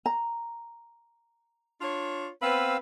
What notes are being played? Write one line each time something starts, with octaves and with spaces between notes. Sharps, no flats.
A#5
D4 F4 C#5
B3 C4 B4 F5 E6